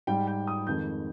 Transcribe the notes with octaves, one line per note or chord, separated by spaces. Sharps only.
G#2 G3 G5
G5
D#6
F2 D#3 G#3 G6